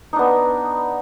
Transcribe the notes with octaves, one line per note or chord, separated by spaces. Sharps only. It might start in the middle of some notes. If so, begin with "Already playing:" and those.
B3 D4 D#4